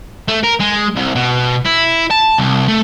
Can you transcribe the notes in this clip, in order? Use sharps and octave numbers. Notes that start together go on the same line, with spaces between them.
A3
A#4
G#3
C2
B2
E4
A5
C2
A3